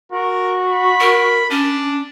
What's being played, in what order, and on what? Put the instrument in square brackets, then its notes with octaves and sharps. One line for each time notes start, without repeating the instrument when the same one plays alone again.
[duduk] F#4 [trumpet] A#4
[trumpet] B5
[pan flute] A#4
[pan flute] C#4 [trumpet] D4